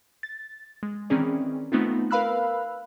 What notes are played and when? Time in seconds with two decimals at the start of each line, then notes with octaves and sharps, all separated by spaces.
0.23 A6
0.83 G#3
1.10 D#3 E3 C4 C#4 G#4 D5
1.72 A3 B3 C4 D#4 F4
2.11 A#4 B4 F5 B5 E6 F#6